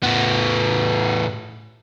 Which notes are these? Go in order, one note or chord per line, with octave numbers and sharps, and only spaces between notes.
A2 B3